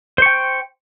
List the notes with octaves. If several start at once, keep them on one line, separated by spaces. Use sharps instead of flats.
C5 G5 C#6